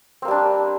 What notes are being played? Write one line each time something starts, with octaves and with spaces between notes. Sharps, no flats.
G3 A#3 C4 D4